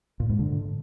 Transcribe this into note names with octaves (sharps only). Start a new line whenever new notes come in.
A#2
G#2
D3